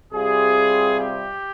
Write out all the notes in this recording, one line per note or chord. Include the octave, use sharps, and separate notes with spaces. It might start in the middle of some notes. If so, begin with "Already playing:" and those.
C3 G3 C4 F4 G#4
G4